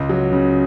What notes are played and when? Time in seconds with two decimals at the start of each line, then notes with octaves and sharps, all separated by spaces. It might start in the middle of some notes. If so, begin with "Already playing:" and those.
Already playing: C#2
0.09 F#3
0.32 C#3